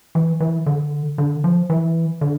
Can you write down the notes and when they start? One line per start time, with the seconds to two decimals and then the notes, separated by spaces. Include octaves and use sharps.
0.15 E3
0.40 E3
0.66 D3
1.18 D3
1.44 F3
1.70 E3
2.21 D3